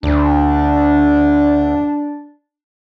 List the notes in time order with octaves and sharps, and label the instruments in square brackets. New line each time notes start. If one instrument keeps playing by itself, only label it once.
[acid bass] D2 [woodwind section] D4